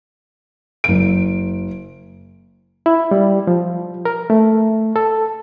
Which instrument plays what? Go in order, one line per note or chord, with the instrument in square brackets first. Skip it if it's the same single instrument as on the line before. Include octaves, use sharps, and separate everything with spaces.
[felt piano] F#1 D7
[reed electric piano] E4
G3
F3
A#4
A3
A4